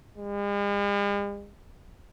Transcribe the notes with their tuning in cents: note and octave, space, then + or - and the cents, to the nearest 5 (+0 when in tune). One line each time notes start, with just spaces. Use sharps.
G#3 -45